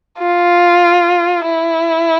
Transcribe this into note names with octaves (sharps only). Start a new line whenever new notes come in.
F4
E4